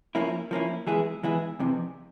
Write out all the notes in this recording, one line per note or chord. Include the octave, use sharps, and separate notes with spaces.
F3 A#3 C#4 E4
F3 A#3 C#4 E4
E3 G#3 B3 E4 G#4
E3 G#3 B3 E4 G#4
F2 C3 E3